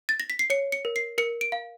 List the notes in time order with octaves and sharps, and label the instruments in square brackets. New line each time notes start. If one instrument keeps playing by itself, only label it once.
[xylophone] A6
A#6
B6
C7
C#5 C#7
C#7
A#4
C7
A#4 C#7
D7
F5